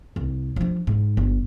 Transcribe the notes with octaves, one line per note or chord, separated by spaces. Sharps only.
C2
F3 D4
G#2
G1